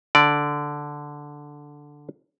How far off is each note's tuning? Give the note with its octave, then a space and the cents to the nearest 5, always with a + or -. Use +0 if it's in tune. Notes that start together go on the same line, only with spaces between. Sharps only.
D3 +0 D5 +0